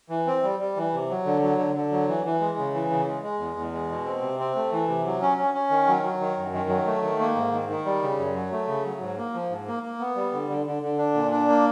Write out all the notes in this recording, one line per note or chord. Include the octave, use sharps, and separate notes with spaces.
E3
C4
G3
G3
E3
C3
F#3
D3
F#3
D3
D3
F#3
E3
E3
G#3
C#3
E3
C#3
G#3
G#3
E2
E2
G#3
B2
C4
C3
C4
A3
E3
C3
F#3
C#4
C#4
C#4
D#3
F#3
F#3
D#3
F#2
D#3
F#3
A3
D#3
A#3
G#2
D#3
D#3
G3
C#3
F#2
F#3
A3
C#3
F#3
G#2
A#3
F3
G#2
A#3
A#3
B3
G3
D3
D3
D3
D3
D4
A#2
D4
A#3